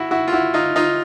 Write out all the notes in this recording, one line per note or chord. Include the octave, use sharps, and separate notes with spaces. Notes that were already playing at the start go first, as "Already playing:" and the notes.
Already playing: E4 F#4
E4 F#4
F4
E4 F#4
D#4 F4
D#4 F4